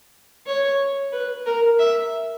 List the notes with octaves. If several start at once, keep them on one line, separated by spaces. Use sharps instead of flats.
C#5
B4
A#4
E5